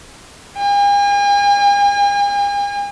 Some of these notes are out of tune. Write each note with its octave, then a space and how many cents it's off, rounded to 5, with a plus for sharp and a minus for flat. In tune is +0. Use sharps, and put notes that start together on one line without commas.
G#5 -45